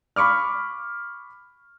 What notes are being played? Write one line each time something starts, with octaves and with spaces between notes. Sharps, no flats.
B5 C#6 D6 F6